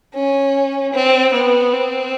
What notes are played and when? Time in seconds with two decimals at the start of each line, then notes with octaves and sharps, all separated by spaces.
0.15 C#4
0.93 C4
1.34 B3
1.73 C4